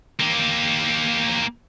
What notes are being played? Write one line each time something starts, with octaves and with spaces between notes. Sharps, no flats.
A#3 G4